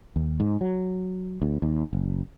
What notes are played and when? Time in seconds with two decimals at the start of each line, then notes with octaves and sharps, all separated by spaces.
0.16 D#2
0.40 G#2
0.61 F#3
1.42 D2
1.62 D#2
1.93 F#1